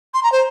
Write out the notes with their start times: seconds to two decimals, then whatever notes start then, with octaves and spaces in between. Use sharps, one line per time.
0.14 C6
0.23 A#5
0.32 C5